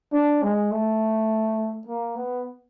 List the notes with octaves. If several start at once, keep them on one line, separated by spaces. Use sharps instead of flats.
D4
G#3
A3
A#3
B3